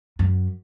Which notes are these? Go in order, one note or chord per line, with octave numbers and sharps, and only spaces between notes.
F#2